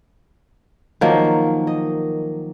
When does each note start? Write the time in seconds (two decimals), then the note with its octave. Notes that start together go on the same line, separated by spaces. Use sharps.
1.01 D#3 F3 F#3 A#3
1.67 D#5